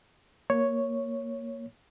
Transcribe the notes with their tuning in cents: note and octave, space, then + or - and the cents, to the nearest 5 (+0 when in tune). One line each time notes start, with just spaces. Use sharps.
A#3 +0 C#5 +0